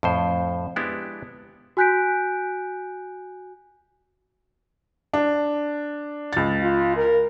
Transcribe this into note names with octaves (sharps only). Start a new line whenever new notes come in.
F2 A2 C5
G#3 B3 D4 E4 G4
F#4 G#5 F#6 G6 B6 D7
D4
C#2 A6
F4
A#4